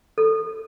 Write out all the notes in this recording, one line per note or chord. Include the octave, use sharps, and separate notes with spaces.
A4